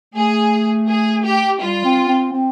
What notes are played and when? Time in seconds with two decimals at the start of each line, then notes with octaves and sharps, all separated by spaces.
0.14 A3 G#4
0.87 G#4
1.23 G4
1.60 G3 F4
1.85 C4
2.08 C4
2.33 C4